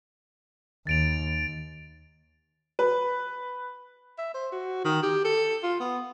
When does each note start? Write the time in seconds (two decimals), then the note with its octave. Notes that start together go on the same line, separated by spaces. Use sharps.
0.87 D#2 A6 D7 F7
2.79 B4
4.18 E5
4.34 C5
4.52 F#4
4.85 D#3
5.03 G4
5.25 A4
5.63 F4
5.80 B3